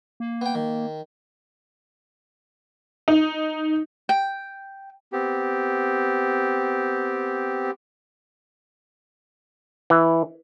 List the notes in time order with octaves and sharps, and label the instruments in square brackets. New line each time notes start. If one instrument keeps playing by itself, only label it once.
[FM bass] A#3
[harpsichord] B3 G5
D#3
[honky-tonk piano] D#4
[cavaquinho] G5
[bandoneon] B3 C4 G4
[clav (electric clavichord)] E3